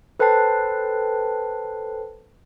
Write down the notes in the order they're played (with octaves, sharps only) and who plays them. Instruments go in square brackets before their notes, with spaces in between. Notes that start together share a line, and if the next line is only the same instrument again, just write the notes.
[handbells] A4 B4 C5 G5 A5 C7